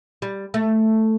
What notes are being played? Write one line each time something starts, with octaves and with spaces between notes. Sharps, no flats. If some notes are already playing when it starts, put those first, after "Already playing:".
G3
A3